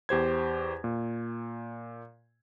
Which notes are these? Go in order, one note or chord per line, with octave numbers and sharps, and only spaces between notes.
E2 G4 C5 G#6
A#2